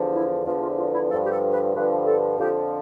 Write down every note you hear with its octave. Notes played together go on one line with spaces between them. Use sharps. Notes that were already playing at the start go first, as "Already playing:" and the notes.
Already playing: E2 D3 F3
E4
E2 D3 F3 F4
F4
F4
E4
G2 D3 F3 A4
G4
A4
B4
G2 D3 F3 B4
A4
F2 D3 F3 G4